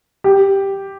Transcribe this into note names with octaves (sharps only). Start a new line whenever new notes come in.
G4